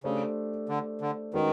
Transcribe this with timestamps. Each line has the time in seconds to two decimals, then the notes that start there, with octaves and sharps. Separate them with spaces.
0.04 C#3 A3 D4 G4 C5
0.69 D3
1.01 D3
1.33 D#3 G#3 C#4 F#4 B4